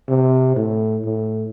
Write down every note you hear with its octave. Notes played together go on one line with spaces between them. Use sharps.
C3
A2
A2